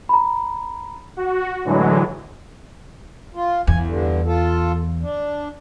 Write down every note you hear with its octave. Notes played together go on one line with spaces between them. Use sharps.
A#5 B5
F#4
A2 D3 E3 F#3 G#3
F4
E2 G#5
G2 D3
F4 A4
D4